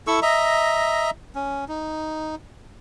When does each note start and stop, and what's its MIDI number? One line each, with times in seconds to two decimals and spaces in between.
0.07 0.20 64
0.07 0.20 69
0.07 0.20 85
0.07 0.20 88
0.22 1.10 75
0.22 1.10 76
0.22 1.10 82
1.35 1.65 61
1.68 2.35 63